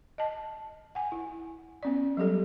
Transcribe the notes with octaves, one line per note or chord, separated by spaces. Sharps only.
D#5 A5
F#5 G#5
E4
B3 C#4 D5
F#3 G3 G4 A4